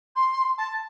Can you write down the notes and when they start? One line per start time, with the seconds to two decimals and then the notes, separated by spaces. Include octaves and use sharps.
0.15 C6
0.58 A5